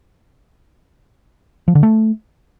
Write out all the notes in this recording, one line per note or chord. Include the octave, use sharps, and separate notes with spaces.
F3
D3
A3